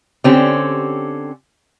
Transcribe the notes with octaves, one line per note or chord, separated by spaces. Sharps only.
D3 C4 C#4 G4